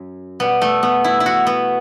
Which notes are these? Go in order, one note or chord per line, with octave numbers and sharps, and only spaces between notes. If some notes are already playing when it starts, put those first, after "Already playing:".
Already playing: F#2 F#3
B2 G3 B3
A3
B3
E4
E4
F#4
B3